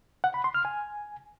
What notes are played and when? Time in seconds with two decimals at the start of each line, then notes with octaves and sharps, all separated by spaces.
0.24 F#5
0.34 B5
0.44 C6
0.54 F6
0.65 G#5